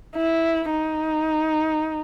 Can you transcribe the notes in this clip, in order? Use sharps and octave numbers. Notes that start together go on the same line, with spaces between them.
E4
D#4